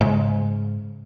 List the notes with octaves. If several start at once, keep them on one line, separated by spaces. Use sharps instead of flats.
G#2 C#3 G#3